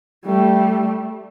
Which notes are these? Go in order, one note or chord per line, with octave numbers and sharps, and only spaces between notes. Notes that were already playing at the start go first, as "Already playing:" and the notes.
G3 A3